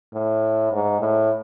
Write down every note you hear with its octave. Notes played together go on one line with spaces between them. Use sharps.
A2
G#2
A2